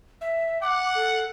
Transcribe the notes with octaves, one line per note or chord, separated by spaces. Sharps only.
E5
F#5 D6
A4